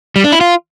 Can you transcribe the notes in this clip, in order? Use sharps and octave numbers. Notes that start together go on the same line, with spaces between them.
G3
D4
E4
F4